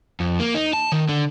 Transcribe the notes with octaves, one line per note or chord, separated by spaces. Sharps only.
F2
A#3
D#4
A5
D#3
D3